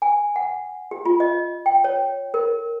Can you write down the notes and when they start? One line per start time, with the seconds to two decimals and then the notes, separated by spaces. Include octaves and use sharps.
0.02 G#5
0.36 F#5
0.91 G4
1.05 F4
1.20 D#5
1.66 G5
1.84 C#5
2.34 A#4